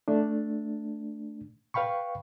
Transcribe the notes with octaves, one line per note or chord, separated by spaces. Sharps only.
A3 D4
B4 F5 G5 B5 C#6